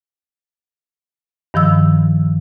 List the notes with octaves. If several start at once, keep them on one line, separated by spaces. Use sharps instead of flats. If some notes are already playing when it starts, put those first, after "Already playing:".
G2 D#3 F3 E6